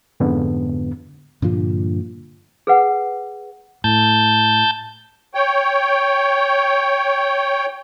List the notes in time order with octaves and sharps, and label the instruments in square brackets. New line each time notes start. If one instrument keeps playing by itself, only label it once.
[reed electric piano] F2 G#2 D3 B3
[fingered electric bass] G2 A#2 D3 F3
[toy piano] G#4 B4 F#5
[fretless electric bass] A2 [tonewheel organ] A5 G6
[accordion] C#5 G5